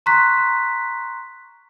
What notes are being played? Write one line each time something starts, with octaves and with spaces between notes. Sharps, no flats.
A#5 C6 C#6 F#6 B6